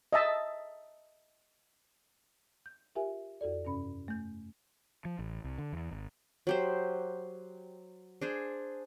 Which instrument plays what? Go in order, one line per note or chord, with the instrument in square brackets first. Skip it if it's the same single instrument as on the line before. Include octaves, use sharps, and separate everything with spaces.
[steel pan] D#5 E5 A5
[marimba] G6
F4 G4 A#4 E5 G#5
F2 F#4 A4 D5
G2 C3 C#4 B5
A3 G6
[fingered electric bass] F3
A1
C2
D3
E2
G#1
[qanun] F#3 G4 C5
D4 G#4 C5